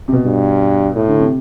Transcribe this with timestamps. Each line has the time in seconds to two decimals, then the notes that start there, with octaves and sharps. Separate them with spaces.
0.08 C3
0.12 B2
0.25 G2
0.96 A2
1.08 D3
1.19 C3